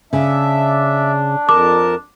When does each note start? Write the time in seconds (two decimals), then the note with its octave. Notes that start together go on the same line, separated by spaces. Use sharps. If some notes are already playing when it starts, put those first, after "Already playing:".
0.13 C#3 D4 E5
1.49 F2 A#4 A5 D6